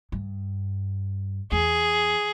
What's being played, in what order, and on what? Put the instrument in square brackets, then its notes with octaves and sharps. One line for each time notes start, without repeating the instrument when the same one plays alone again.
[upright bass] G2
[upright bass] E2 [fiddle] G#4